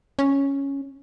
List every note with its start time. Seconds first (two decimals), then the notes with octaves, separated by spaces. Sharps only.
0.19 C#4